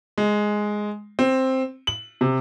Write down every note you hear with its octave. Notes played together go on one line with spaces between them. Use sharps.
G#3
C4
F#7
C3